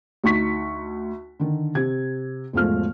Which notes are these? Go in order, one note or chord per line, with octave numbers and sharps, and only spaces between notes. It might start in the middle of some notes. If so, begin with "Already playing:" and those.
D2 D#4 C#6 B6
D3 D#3
C3 G#6
E1 G#2 F3 A3 F6